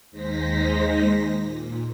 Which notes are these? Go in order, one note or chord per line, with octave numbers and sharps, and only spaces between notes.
D#2 G#3 D#4 C5 A#6 B6
A#2